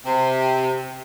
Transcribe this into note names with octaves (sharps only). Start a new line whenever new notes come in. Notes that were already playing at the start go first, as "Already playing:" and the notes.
C3